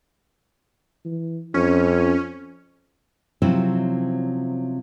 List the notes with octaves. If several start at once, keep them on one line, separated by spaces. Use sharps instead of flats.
E3
F2 C#4
C3 F3 F#3 C4 C#4 E4